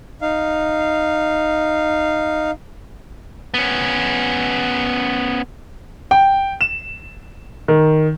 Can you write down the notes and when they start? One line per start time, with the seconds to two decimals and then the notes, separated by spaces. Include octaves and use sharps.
0.22 D#4 F5
3.54 B3 C#4
6.11 G5
6.61 E7
7.68 D#3